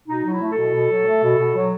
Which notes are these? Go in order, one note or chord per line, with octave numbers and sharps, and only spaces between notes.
B2 D#4
F#3
E4
A3
B2 A4
B2
F#3
A3
B2
B2
F#3